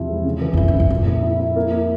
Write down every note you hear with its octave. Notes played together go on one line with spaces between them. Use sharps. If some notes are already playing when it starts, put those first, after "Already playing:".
Already playing: E2 C3 F3 E4
G#3
C#3
E3
F2
G2 E4
G#2
C#3
F2
F2 A#2
E4
E4
E4
A#3
E4